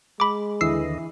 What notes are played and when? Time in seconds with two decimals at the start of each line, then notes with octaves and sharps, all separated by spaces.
0.20 G#3 B5 D6
0.61 D#2 D3 E3 D#5 E6 C7